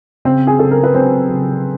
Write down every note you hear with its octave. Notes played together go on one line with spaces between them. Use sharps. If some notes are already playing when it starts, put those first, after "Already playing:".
C#3 C4 C5
G#4
C#3 A4
A#4
B4
F#3 C4 C5
C#3